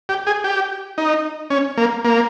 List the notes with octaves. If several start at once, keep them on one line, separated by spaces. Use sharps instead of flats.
G4
G#4
G4
D#4
C#4
A#3
A#3